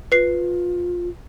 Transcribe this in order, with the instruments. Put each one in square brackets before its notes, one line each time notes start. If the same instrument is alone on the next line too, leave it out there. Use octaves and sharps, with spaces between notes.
[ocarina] F4 [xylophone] B4 C7